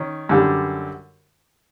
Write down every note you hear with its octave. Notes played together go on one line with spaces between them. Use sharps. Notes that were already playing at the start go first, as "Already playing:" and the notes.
Already playing: D#3 C#4
F#2 D3 G3